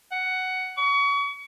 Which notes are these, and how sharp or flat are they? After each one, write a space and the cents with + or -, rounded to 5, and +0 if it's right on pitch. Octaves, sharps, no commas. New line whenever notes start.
F#5 +10
C#6 +35